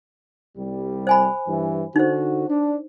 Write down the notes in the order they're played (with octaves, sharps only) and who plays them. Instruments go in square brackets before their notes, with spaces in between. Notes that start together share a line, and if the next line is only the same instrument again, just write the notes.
[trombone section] C2 G3
[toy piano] C5 G#5 B5
[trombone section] G2 E3
[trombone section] D3 F#4 [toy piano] D#4 C5
[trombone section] D4